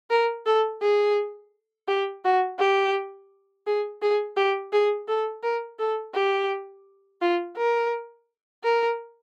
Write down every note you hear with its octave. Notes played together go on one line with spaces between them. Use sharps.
A#4
A4
G#4
G4
F#4
G4
G#4
G#4
G4
G#4
A4
A#4
A4
G4
F4
A#4
A#4